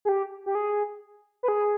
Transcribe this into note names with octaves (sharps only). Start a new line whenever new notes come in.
G#4
G4
G4
G#4
B4
G#4